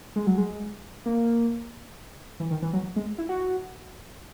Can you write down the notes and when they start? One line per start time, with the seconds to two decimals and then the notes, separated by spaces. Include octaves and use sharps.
0.16 G#3
0.27 F#3
0.38 G#3
1.06 A#3
2.40 E3
2.51 D#3
2.62 E3
2.73 F#3
2.96 G#3
3.18 E4
3.29 F#4